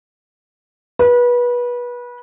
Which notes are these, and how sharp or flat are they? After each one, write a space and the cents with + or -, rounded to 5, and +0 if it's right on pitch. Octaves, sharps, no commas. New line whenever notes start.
B4 -25